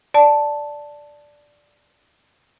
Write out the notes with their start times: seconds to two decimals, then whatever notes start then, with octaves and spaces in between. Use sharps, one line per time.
0.14 D5 A5